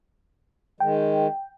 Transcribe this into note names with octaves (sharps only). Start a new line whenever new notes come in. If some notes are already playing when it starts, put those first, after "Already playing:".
D#3 G#3 G5